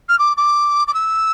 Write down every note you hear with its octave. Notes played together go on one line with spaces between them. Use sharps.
F6
D6
D6
D6
E6